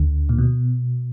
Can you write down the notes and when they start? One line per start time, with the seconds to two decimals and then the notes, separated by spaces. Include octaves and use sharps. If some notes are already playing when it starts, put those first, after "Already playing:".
Already playing: D2 D3
0.29 A#2
0.38 B2